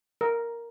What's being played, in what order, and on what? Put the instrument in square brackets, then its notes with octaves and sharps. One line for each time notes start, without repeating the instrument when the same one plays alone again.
[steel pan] A#4